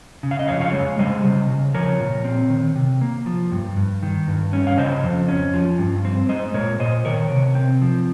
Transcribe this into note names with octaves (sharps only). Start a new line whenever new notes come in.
C#3
F5
D#5
F2 C#5 F5
C#5 F5
G#3
G3 C5 D#5
C#3
C#3
F3 A#4 C#5
A#2
C4
D#3
C3
A#3
F3
G2
G2
D#3
G2
C#4
F5
C#3 C5 D#5
F2
C#4
F3
G2
C4
G#3 C5 D#5
A#2 A#4 C#5
A#2 C5 D#5
D#3 A#4 C#5
C3
C4
F3